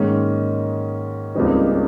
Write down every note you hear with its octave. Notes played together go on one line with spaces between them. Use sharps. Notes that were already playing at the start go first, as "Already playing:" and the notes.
Already playing: G#2 D#3 G#3 A#3 C#4
C#2 C#3 G3 A#3 C4 D#4
C#4